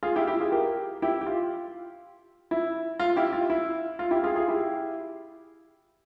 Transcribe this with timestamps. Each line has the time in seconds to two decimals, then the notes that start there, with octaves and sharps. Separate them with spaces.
0.03 F4 G#4
0.16 E4 G4
0.27 E4 G4
0.40 F4 G#4
0.52 G4 A#4
1.02 E4 G4
1.21 G4
1.26 F4
2.51 E4
2.99 F4
3.16 E4 G4
3.33 F4
3.50 E4
3.99 F4
4.11 E4 G4
4.23 F4 G#4
4.36 F4 G#4
4.48 E4 G4